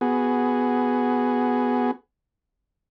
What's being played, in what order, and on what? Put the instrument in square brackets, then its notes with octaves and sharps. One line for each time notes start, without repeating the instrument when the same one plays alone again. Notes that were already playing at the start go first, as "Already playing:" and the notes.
[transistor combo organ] B3 F#4 G#4